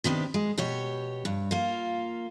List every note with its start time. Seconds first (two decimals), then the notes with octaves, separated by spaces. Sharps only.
0.04 C3 D#3 B3 D4 G4
0.34 G#3
0.58 B2 G4 C#5
1.25 G2
1.51 A#3 F4